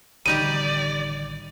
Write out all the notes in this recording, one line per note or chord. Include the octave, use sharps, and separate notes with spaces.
A1 D3 D#3 G3 D#4 G4 D5 D#7